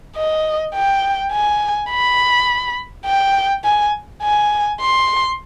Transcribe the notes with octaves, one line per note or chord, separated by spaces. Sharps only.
D#5
G5
G#5
B5
G5
G#5
G#5
C6